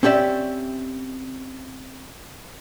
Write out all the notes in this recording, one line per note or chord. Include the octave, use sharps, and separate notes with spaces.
C4 C#4 G4 D5 E5